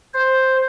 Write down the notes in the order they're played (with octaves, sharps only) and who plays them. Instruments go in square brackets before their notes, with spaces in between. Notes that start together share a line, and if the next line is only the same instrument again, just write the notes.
[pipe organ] C5